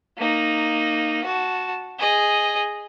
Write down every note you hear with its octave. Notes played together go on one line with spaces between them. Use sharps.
A#3 D#4
F#4 A5
G#4 D#5